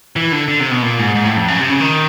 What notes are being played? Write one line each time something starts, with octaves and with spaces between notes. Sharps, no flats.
E3
D3
D3
C3
B2
A#2
G#2
G#2
A2
F2
F#2
C3
C#3
D#3